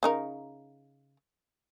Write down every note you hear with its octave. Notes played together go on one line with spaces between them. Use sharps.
C#3 D#4 A#4